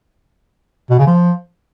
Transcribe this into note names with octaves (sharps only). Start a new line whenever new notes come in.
B2
C#3
F3